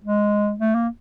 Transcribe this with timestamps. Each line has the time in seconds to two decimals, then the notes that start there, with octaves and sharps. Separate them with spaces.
0.04 G#3
0.60 A3
0.75 A#3